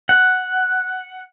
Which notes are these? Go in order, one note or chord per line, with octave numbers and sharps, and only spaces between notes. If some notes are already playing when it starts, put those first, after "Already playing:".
F#5